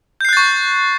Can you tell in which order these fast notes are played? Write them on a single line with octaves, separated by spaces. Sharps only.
G6 C7 F#6 A6 C#6